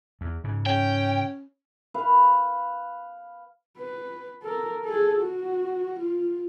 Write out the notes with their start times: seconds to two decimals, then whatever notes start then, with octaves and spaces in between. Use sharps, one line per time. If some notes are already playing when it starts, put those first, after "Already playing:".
0.21 E2
0.44 G#2 C#3
0.66 C#4 G5
1.94 B4 F5
3.78 B4
4.43 A4 A#4
4.85 G#4 A4
5.22 F#4
5.99 F4